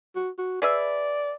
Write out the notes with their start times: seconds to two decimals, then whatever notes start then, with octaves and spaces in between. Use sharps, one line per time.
0.16 F#4
0.38 F#4
0.62 G#4 B4 D5 E5